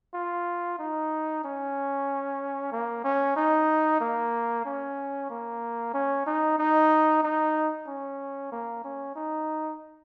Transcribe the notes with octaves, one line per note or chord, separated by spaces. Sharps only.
F4
D#4
C#4
A#3
C#4
D#4
A#3
C#4
A#3
C#4
D#4
D#4
D#4
C#4
A#3
C#4
D#4